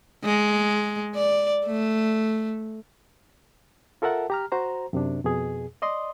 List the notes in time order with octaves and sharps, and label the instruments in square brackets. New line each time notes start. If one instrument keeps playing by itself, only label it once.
[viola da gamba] G#3
D5
A3
[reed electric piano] F4 A4 A#4 E5 F#5 A5
G4 A#5 F6
F#4 C5 A#5
F#2 C3 D4
F2 B2 G#4
D5 D#5 C6 D#6